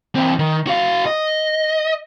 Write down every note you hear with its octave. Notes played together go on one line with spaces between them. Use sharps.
E3 C4
D#3
F#4 F5
D#5